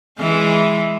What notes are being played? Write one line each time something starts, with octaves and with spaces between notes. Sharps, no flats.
E3 G#3